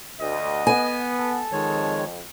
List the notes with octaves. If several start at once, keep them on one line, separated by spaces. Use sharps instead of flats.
D2 D#5
B3 G#5
A4
F2 D#3 G#3 C#5